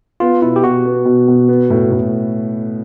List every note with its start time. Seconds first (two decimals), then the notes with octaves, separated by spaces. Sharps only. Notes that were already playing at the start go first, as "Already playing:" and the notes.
0.20 B3 F4
0.42 B2 E4
0.56 G4
0.64 B2 F#4
0.85 B3
1.05 B2
1.28 B2
1.49 B3
1.70 A2
1.92 A2